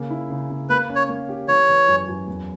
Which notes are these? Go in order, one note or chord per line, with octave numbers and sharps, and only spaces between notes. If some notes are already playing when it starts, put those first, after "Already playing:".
Already playing: C#3 A#3
E4
C#3
C#3
A#3 B4
C#4
C#5
A#3
G4
E3 C#5
E3
F#2
F#2
E2